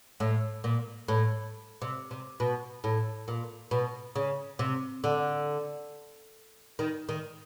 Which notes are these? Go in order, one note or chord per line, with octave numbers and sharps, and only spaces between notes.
A2
A#2
A2
C3
C3
B2
A2
A#2
B2
C#3
C3
D3
D#3
D#3